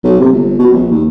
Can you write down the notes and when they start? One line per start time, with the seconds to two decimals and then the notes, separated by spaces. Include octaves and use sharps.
0.04 B1
0.20 C3
0.32 G1
0.59 B2
0.73 A#1
0.91 D#2